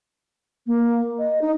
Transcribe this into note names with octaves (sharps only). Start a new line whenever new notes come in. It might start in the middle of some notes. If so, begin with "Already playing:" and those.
A#3
D#5
D#4